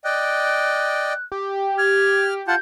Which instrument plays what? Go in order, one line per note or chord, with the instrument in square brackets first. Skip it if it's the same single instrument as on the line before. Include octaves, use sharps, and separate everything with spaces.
[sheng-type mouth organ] D5 D#5 G5 [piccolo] F#6
[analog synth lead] G4
[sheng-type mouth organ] F6 [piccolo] G#6
[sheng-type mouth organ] F4 F#5 A5 [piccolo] G6